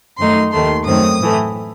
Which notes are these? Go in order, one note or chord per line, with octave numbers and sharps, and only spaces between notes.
F#2 D#3 A3 D#4 C6
D#2 D#3 A3 C6
F#2 D#3 F#3 A3 C4 D#6
A2 E3 A3